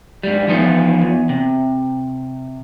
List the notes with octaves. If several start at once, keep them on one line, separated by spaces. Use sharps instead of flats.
G#2 G3
E3 F3 B3 D#4 F4
E2
C3